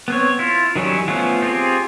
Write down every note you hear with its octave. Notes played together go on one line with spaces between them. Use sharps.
B3 C4 C#5
E4 F4
D#3 F#3 G3 C#4 E4
F3 A3 B3 C#4 F4
C4 F4 G4 G#4